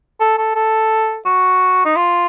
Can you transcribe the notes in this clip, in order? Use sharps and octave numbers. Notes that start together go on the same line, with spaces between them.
A4
A4
A4
F#4
D#4
F4